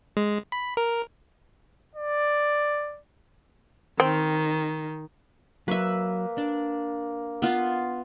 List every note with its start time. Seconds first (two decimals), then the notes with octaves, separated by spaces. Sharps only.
0.17 G#3
0.52 B5
0.77 A#4
1.95 D5
4.00 D#3 C4
5.68 F#3 A#3 B4 E5
6.38 D4
7.42 B3 F4